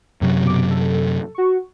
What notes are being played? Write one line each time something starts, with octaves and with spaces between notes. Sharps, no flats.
F#2 C3 F#3
B2 D6
A4
F#4 C#6